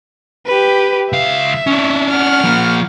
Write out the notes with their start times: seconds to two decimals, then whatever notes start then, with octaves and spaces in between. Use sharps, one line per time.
0.46 G4 B4
1.13 C#2 E5 F5
1.67 C#4 D4
2.10 F#5 F6
2.44 F3 A#3